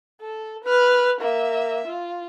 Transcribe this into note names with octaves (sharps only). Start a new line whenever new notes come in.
A4
B4 F6
A#3 E5
F4